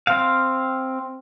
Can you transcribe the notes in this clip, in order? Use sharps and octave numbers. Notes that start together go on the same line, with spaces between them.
C4 F5